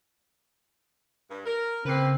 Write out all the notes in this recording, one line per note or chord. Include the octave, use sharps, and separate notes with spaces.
G2
A#4
A2 C#3 A#3 C4 B4 C7